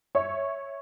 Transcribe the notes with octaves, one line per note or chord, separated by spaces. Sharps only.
C#5 E5 C#6